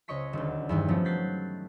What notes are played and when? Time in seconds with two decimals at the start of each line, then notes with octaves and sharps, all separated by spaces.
0.08 C#2 C#5 D#5 C#6 B6
0.33 D#1 D2
0.69 E2 G2 D#3
0.88 F3 F#3 A3 B3 C#4
1.05 F#6 G6 A6 B6 C7